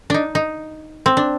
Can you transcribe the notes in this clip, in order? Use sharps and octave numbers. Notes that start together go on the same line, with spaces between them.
D4 D#4
D#4
C4
D4